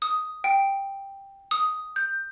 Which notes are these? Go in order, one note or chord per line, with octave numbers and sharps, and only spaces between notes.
D#6
G5
D#6
G6